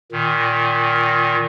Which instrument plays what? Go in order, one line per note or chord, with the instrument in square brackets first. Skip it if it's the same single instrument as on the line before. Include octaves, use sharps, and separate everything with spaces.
[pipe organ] A#2 D#3